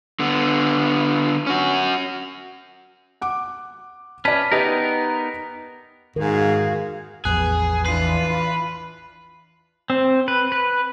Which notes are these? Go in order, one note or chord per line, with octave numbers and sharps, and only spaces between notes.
D3 B3
C#4 F#4
F#5 D6
C#4 B4 D5 A5
B3 D#4 G4 A#4 B4 D#5
G#2 D#3 F#4 G#4 A#4 F5
A1 E2 F3 B3 G#4 F#6
E3 D4 F4 B4 C7
C4
B4
B4